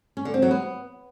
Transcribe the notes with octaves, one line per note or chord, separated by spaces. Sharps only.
C#4
D3
C4
F#3
B3